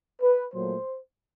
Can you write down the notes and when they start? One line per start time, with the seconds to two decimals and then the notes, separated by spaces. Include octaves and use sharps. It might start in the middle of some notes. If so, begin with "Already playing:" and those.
0.21 B4
0.54 A#2 F#3 A3 C5